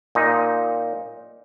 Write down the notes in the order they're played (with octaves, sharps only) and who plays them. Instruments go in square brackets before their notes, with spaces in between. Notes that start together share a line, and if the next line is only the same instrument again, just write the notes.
[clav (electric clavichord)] A#2 D#4